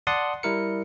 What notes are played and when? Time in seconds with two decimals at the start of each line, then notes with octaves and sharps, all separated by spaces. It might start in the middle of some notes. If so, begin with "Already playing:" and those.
0.07 D5 F#5 A5 C6 D#6
0.43 G3 E4 A#4 C#7